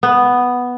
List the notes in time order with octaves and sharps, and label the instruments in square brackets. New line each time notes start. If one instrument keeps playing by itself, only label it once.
[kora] B3